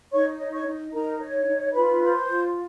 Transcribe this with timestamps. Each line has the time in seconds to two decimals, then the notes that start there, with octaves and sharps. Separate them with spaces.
0.12 D#4 C#5 C#6
0.40 C#5
0.53 C#5 C#6
0.66 D#4
0.93 D#4 A#4 A#5
1.20 C#5
1.47 D#4
1.74 F4 B4 B5
2.01 C5
2.28 F4